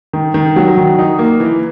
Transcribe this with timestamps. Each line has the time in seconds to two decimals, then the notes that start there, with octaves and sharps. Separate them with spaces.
0.13 D#3
0.34 D#3
0.56 F#3
0.77 D#3
0.99 D#4
1.19 A#3
1.40 E3